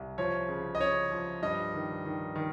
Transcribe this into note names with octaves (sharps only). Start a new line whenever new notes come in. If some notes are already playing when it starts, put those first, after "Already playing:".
Already playing: C2
F3 C#5
C#3
D#5
C#3 C#5
F3
G2 D#5
D#3
D#3
D#3